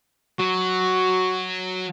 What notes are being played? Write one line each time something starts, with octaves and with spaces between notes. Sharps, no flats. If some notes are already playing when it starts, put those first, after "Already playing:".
F#3 F#4